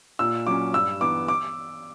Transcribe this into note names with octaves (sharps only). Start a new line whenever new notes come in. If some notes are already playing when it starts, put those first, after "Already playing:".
A#2 E6
F#3 C#4 D6
G2 E6
E3 B3 D6
D6